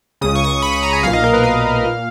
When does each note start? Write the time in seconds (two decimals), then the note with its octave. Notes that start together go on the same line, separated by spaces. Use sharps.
0.21 C#2 C#3 D#6
0.35 C#6
0.44 D#6
0.49 C#6
0.62 B5
0.73 B5
0.83 A#5
0.93 G#5
1.03 B1 A#2 F5
1.13 D#5
1.24 A#4
1.33 B4
1.43 F5
1.84 A#2